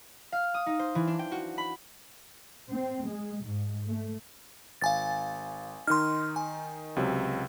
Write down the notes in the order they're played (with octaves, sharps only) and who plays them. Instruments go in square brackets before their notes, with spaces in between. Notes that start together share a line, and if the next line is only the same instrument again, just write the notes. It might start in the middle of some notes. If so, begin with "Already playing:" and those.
[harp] F5
D#6
D#4
C5
E3
D4
G5
F#4
B5
[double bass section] C4
G#3
G#2
A3
[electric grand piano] G#1 [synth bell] F5 G#5 A6
[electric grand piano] D#3 D#4 [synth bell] C6 F6
[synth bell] G#5
[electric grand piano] C#2 C3 F#3